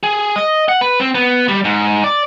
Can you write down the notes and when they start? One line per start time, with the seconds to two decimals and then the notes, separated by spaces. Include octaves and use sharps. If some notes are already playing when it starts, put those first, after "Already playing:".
0.03 G#4
0.36 D#5
0.68 F#5
0.81 B4
1.00 C4
1.15 B3
1.48 G3
1.65 G#2
2.04 D5